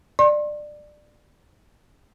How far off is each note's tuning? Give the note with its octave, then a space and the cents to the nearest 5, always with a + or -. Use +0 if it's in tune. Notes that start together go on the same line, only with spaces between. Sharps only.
D5 +20 C6 +40